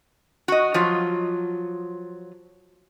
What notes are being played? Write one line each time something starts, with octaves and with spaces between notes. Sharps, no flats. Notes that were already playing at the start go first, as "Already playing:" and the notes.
F#4 D#5
F3 F#3 F4